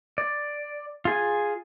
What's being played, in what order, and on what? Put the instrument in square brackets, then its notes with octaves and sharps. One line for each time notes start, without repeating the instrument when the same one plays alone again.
[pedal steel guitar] D5
F4 G#4 G#5